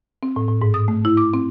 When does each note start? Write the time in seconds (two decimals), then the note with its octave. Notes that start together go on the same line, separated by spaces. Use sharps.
0.23 C4
0.36 A2
0.48 A2
0.62 G#2
0.74 D#6
0.88 A3
1.05 E4
1.17 D6
1.34 C4